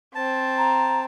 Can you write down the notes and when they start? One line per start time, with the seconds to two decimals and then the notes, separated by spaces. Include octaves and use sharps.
0.15 C4 A5
0.58 A#5